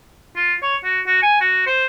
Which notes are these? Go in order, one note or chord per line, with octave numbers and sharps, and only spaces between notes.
F4
C#5
F#4
F#4
G#5
F#4
C5